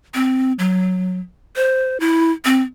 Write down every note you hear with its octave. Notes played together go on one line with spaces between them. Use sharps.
C4
F#3
C5
E4
C4